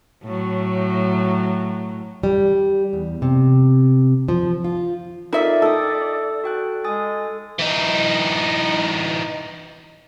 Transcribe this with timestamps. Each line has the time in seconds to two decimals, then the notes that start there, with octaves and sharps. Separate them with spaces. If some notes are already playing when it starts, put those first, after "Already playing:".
0.24 A2 F#3
2.23 G3
2.93 E2
3.22 C3
4.28 F3
4.64 F4
5.33 D#4 F4 A4 A#4 D5 E5
5.62 A4 G5 D#6
6.44 F#4 G5 F#6
6.84 G#3 G#5 D#6 A6
7.59 E3 D#4